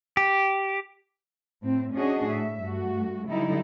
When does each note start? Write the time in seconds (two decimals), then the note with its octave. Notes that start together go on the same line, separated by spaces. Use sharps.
0.17 G4
1.62 A2 C4
1.94 C#4 D4 F#4 G#4 D#5
2.26 A2 E5
2.61 G2 A3 F#4
3.29 D3 F#3 G3 D#4 E4